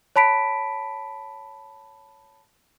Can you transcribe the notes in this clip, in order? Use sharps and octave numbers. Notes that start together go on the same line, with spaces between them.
C#5 A5 B5 B6 D7